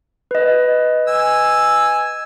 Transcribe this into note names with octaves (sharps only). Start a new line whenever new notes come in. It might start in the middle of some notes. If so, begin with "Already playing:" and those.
B4 D#5
G#5 E6